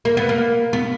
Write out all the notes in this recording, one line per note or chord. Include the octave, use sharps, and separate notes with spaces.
A#3
B3
A#3
B3